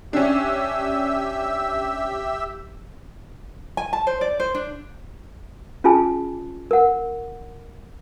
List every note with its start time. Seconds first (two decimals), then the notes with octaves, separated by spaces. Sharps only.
0.13 C#4 D4 G4 E5 E6
3.77 G#5
3.93 A5
4.07 C5
4.21 D5
4.40 C5
4.54 D4
5.84 C#4 F4 G#4 G#5 A5
6.71 A#4 F#5